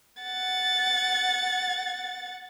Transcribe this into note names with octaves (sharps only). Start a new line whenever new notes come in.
F#5 A6